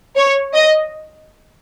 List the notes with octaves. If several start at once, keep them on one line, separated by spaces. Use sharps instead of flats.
C#5
D#5